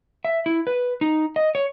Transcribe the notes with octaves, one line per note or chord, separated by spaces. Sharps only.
E5
E4
B4
D#4
D#5
C#5